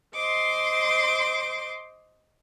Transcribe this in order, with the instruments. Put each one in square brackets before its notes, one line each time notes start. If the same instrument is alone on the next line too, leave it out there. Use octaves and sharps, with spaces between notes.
[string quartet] C5 D#5 C6 D6